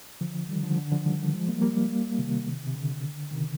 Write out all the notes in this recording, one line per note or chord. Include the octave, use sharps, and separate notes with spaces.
D3 F3
D#3 G3
D3 F3
D3
D3 F3
D#3 G3
F3 G#3
G3 A#3
G3 A#3
C3 D#3
C3
D3
C3 D#3